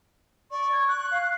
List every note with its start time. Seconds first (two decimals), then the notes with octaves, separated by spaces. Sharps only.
0.51 D5 C#6
0.73 G#6
0.88 F#6
1.11 F5